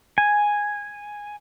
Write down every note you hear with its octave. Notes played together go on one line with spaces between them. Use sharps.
G#5